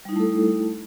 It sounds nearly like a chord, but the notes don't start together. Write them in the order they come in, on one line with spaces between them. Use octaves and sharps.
G3 D#4 E4 A3 A4